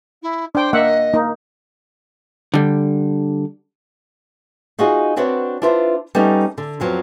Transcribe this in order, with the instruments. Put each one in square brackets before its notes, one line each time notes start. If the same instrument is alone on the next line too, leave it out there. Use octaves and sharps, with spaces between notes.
[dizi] E4
[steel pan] D4 G5 [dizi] C5
[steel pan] A#3 E5 F#5 [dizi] D#5
[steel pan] A#3 D#4
[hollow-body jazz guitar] D3 G3
[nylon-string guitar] D#4 F4 F#4 G#4 D#5
C4 D4 F#4 B4 C#5 F#5
D4 E4 F4 B4 C5
G3 B3 C#4 D#4 A4
D3
F2 F3 F#3 B3